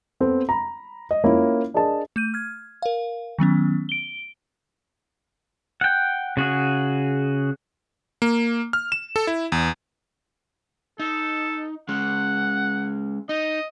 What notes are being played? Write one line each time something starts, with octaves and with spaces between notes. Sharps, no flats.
B3 C4 A4
A#5 B5
D#5
A#3 C#4 E4 F4 A#4 C#5
D4 G#4 A#4 D#5 A5
A3 G6 D#7
F6 G#6
A#4 F5
D#3 F#3 B3 C#4
D7 G7
F#5 G5
C#3 F#4 G#4
A#3
F6
E7
A4
E4
E2
D#4 A4
G#3 C#4 F#5
D#4 D#5